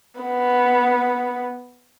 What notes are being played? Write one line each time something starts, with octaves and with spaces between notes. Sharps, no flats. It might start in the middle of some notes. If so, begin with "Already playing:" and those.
B3